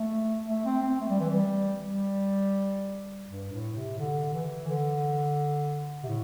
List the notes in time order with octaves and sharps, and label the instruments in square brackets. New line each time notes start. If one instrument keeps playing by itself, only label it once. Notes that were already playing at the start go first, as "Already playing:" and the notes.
Already playing: [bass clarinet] A3
A3
C4
C4
A3
G3
E3
G3
G3
G2
A2
C3
D3
E3
D3
C3
A2